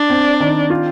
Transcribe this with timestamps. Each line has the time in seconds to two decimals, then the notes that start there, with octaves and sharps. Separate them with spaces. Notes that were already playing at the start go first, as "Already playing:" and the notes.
Already playing: D4
0.10 C4
0.40 D#3
0.70 F4